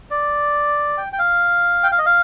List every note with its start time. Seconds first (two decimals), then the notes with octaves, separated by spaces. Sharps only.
0.11 D5
0.98 G5
1.13 G5
1.19 F5
1.83 G5
1.92 F5
1.98 D#5
2.06 F5